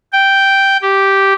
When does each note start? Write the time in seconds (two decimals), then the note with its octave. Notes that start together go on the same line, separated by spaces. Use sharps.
0.13 G5
0.82 G4